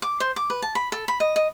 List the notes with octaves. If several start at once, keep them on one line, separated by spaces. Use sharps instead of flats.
D6
C5
D6
B4
A5
B5
A4
B5
D#5
D#5